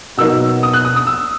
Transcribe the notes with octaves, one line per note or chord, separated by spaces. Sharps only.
B2 F#3 A#3 D#4 E6
D#6
F#6
D#6
D#6
E6